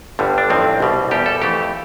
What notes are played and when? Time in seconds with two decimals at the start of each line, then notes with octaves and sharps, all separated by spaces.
0.19 G1 G2 D3 G3
0.38 D4
0.50 A1 G2 F3 C4
0.80 C2 B2 G3
1.11 E2 B2 G3 G4
1.26 A4
1.42 F2 E3 A3 G4